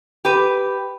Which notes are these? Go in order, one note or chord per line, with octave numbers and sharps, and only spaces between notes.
G4 B4